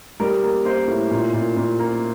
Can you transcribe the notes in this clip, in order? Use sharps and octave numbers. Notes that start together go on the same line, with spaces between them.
G3 A#4
A#3
A#3 C5
A2
A#2
A#2
A#2
A#3